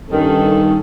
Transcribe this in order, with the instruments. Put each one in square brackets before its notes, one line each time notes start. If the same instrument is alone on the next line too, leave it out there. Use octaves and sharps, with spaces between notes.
[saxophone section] G2 D#3 [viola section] C#4 A4